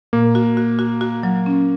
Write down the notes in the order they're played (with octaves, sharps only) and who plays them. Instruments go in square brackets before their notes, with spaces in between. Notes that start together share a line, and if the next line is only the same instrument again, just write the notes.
[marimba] A#2 [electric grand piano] A#3
[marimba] F#4
F#4
F#4
F#4
F#3
C#4